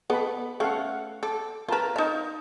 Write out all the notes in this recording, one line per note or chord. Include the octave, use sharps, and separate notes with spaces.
B3 A4 B4 D#5 B5
A3 C#4 A4 F5 F#5
A4 D6
F4 A#4 B4 A5 A#5
D#4 D#5 F5 A5